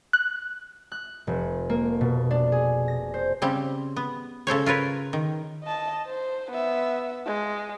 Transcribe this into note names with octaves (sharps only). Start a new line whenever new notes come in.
F#6
F#6
F1
A#3
B2
D4
G#4
A#6
C5
C#3 G3 C4
B3
C#3 A4 C5 C#5
F4 A#4 B4 C#5
D#3
D#5 A5
C5
B3 E5
G#3